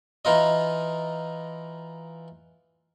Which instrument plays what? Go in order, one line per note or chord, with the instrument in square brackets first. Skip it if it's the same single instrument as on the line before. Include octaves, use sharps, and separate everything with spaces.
[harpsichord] E3 D#4 F4 D#5